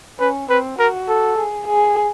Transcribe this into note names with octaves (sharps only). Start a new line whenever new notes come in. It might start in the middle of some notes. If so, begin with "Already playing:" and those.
C#4 B4
C4 B4
F#4 A#4
A4
G#4
G#4